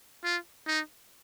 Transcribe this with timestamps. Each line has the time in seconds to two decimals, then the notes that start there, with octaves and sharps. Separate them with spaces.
0.24 F4
0.67 D#4